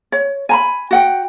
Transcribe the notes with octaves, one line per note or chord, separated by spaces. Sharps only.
C#5
G#5 A#5 B5
F#4 F#5 G5